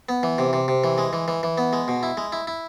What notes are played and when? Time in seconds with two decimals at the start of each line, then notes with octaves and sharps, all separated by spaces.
0.09 B3
0.23 E3
0.38 C3
0.53 C3
0.68 C3
0.84 E3
0.98 G#3
1.13 E3
1.28 E3
1.43 E3
1.58 B3
1.73 G#3
1.88 B2
2.03 E4
2.17 G#3
2.32 E4
2.47 E4